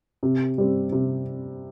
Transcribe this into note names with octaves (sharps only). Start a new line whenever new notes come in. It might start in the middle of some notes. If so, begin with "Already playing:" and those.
C3
G3 C4
C3